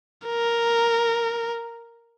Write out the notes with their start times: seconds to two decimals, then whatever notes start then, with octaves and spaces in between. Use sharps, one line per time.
0.27 A#4